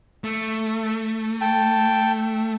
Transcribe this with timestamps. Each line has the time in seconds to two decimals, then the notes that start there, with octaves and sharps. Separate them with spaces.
0.24 A3
1.41 G5 A5